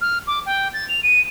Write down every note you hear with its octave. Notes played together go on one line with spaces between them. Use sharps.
F6
D6
G5
A6
F7
D#7